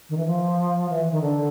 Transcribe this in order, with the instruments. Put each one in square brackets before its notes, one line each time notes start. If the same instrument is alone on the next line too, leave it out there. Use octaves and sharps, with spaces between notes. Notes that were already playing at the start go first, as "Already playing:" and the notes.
[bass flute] D#3
E3
F3
E3
D#3
D3